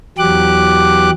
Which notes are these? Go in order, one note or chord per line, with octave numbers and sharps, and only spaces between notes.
E2 F#3 G4 D6 F#6